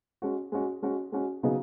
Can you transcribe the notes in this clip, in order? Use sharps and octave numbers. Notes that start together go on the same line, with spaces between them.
G#3 C#4 F#4
G#3 C#4 F#4
G#3 C#4 F#4
G#3 C#4 F#4
C#3 F#3 B3 D#4 G#4